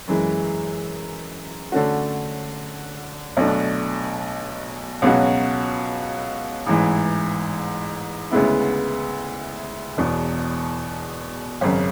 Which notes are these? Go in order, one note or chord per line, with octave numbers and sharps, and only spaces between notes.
F#2 E3 G#3
D3 A3 C#4 F#4
B1 B2 A3 D4
C#2 B2 F#3 C#4 F#4
A1 G#2 E3
D2 C#3 G#3 B3 E4
E1 E2 B2
G#1 F#2 C#3